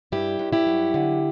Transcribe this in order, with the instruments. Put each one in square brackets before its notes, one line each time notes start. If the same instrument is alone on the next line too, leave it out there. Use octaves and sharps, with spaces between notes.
[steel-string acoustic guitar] G2 E4 G4
G2
E4 G4
F#3
D3